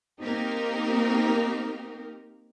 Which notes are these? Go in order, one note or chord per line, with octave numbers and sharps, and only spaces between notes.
A#3 C4 D#4 G4 A#4